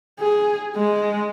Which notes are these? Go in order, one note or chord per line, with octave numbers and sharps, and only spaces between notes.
G#4
G#3